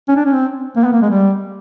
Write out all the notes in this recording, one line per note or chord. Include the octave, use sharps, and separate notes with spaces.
C#4
D4
C#4
C4
A#3
B3
A#3
G#3
G3